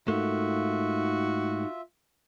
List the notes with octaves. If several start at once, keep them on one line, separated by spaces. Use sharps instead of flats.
G#2 A3 A#3 D#4 F4 F#4 E5